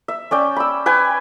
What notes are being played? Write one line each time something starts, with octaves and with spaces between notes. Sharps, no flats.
E5
C#4 D5 G5
B5 E6
B4 G5 G#5